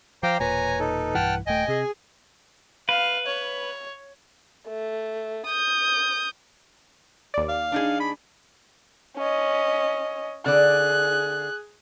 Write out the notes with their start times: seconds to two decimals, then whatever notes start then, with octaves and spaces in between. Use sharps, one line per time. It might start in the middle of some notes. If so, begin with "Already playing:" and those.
0.23 F3 C5 F5 G5 A#5 D6
0.40 E1 A#2 B4 C#5 G#5 A#5
0.80 D#4 A4
1.15 B1 G2 E3 F#5 G5 A5 F6
1.47 D#1 A3 D#5 G5 G#5
1.68 C3 G#4
2.89 B4 F5
3.26 C#5
4.68 A3
5.46 D#6 G6
7.34 D#2 D5
7.49 F5
7.72 D4 D#4 G#4
8.00 B5
9.17 C#4 D#5
10.46 D3 G#4 D5 F#6